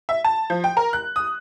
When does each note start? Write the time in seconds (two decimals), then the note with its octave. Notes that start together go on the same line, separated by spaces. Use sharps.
0.09 E5
0.24 A5
0.50 F3
0.64 G5
0.77 A#4
0.93 F#6
1.16 D#6